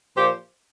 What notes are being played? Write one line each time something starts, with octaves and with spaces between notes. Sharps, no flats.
A#2 F3 G4 C5